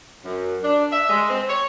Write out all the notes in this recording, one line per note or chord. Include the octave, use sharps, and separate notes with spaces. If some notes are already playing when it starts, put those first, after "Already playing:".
F#2
D4
E5
G#3
C4
C#5